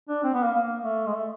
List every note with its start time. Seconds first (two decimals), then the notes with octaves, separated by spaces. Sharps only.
0.09 D4
0.24 C4
0.34 B3
0.43 A#3
0.54 A#3
0.84 A3
1.06 G#3
1.15 A3